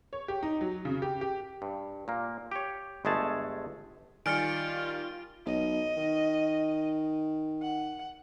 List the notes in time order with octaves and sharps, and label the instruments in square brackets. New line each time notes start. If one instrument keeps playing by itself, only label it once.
[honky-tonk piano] C#5
G4
D#4
F#3
C#3
G4
G4
[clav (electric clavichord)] G2
A#2 A#3
G4 C#5
G1 G#3 A3 G#4 A5
[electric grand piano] D#3 G3 D5 [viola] F4 [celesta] G#5 C#7 [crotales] F6 D7
[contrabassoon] B1 [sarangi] D#5
[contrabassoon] D#3
[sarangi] F#5